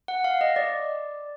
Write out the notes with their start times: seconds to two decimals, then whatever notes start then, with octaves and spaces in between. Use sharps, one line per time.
0.08 F#5
0.24 F5
0.41 D#5
0.56 D5